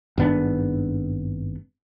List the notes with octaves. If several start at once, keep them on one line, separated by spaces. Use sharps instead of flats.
G#1 G2 B3 D4